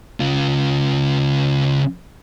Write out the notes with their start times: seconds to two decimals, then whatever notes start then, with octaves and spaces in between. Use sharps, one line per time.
0.20 C#3 F4